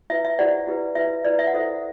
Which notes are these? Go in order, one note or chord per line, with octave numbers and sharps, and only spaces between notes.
E4 B4 E5
E5
E4 G4 C5 D5 F#5
E4 G4 B4
E4 B4 E5
E4 B4 D5
E5
F#5
E4 A4 C5 E5